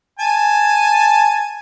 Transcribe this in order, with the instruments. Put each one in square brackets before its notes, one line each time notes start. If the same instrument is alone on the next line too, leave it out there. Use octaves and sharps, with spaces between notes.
[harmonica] G#5 A5